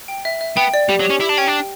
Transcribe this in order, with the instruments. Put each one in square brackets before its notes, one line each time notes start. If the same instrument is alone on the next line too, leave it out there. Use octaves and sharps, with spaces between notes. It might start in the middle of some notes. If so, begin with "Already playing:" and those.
[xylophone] G5
E5
E5
[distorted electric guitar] B3 [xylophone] G5
[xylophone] D5
[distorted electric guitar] G3 [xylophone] G4
[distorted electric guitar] F#3
[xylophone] G4
[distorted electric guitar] C#4
[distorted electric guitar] E4 [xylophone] G4
[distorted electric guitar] D4
[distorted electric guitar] C#4 [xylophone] G5
[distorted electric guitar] D4 [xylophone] G5